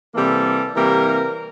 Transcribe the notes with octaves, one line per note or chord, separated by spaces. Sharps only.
C3 E3 G3 A#3 A4
C3 E3 G3 A#3 A#4